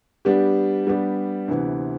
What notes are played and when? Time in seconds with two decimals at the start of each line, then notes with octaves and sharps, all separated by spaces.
0.25 G3 B3 D4 G4
0.87 G3 B3 D4 G4
1.48 D2 C3 E3 B3